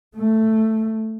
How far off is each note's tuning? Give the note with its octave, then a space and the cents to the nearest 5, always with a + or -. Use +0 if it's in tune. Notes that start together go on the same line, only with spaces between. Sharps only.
A3 +5